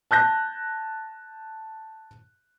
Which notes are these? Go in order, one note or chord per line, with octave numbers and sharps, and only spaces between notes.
A5 F#6 G6 A#6